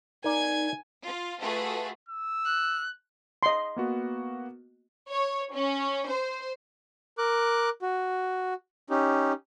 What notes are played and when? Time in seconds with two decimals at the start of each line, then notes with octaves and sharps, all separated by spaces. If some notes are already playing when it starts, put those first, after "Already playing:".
0.24 D#4 A#4 D5 G#5 G#6
1.02 F4
1.40 A3 F4 F#4 G#4 A4 B4
2.09 E6
2.45 F#6
3.43 D#5 C6
3.76 A#3 B3 F#4
5.10 C#5
5.54 C#4
6.09 C5
7.18 A#4 D6 F#6
7.82 F#4
8.90 C#4 D#4 G4